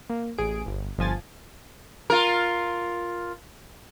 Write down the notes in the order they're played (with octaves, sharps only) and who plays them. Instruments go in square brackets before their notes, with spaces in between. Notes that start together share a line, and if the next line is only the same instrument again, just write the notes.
[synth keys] A#3
A1 G#4 D7
G1
G1 F3 G#5 A6
[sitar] F4 A#4